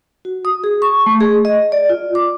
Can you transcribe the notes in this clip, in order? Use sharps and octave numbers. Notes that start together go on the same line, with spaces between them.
F#4
D#6
G#4
C#6
A3
G#4
D#5
D5
F4
D6